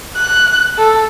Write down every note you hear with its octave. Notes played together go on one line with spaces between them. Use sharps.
F#6
A4